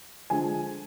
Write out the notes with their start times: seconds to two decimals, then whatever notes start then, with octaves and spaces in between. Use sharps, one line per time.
0.30 D3 F3 G#3 G#5